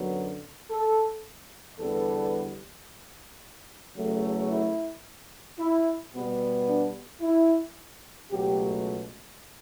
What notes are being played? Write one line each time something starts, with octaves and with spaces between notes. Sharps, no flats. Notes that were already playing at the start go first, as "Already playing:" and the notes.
Already playing: F#2 D3 F#3 B3
A4
E2 D3 G3 B3 A4
E2 C#3 F#3 A3
E4
E4
B2 G3 B3
D4
E4
C#2 B2 F#3 A3 G4